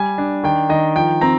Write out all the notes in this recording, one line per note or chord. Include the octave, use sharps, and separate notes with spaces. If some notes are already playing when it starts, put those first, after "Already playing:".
Already playing: G3 G#5
D4
D#3 G5
D#3 D#5
F3 G5
C4 A#5